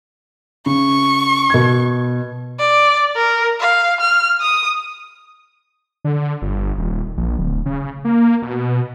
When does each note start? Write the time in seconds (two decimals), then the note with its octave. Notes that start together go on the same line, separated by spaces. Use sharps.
0.66 C#3 C#6
1.50 B2 G#6
2.59 D5
3.16 A#4
3.61 F5
4.01 F6
4.41 D#6
6.05 D3
6.42 G1
6.78 D#1
7.17 A#1
7.38 D1
7.66 C#3
8.05 A#3
8.42 B2